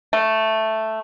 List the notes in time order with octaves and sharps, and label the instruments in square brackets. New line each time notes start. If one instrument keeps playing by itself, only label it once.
[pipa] A3